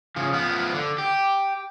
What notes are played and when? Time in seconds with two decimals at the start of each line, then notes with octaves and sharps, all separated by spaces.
0.16 C#3 F3
0.33 F3 B3
0.73 D3
0.98 G4